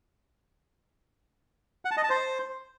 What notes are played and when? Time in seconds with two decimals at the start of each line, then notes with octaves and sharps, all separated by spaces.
1.85 F#5
1.91 A5
1.97 D#5
2.03 A5
2.10 C5